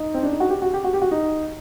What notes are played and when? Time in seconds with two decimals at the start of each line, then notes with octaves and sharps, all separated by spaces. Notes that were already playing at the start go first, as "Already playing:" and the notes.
Already playing: D#4
0.14 C4
0.23 D4
0.32 D#4
0.40 F#4
0.50 G4
0.62 F#4
0.74 G4
0.84 F#4
0.93 G4
1.02 F#4
1.11 D#4